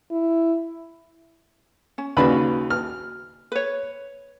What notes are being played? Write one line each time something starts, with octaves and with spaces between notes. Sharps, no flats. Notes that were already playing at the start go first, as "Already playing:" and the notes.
E4
C#4
D#2 C#3 F#4 B4 D5 B5
F6
B4 C#5